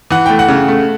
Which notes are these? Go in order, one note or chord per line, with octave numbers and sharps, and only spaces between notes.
E3 F#5
A3 G5
F#5
C#3
A3